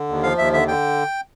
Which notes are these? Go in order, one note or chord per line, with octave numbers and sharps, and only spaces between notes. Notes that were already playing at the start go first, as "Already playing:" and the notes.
Already playing: D3
D#2
F3 F5
D#2 E5
D3 E5
D3 G5